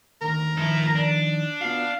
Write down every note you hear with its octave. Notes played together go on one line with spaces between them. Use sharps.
D2 D#3 A#4
D#3 F3 D#4 E4 A4
D4
B3 F4 F#4 F5